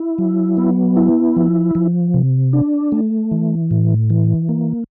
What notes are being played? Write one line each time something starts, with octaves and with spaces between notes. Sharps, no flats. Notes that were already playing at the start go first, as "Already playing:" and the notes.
Already playing: E4
F#3
B3
E4
F3
F3
C3
D4
A3
E3
A2
E3
A#3